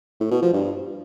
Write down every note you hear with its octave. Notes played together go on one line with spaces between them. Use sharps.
A2
B2
F3
G2